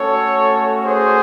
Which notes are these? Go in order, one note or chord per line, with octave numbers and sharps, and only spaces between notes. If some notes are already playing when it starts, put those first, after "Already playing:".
Already playing: A3 C#4 F#4 A4 C#5
G#4 C5